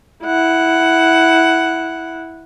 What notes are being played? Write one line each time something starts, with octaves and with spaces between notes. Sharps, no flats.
E4 F#5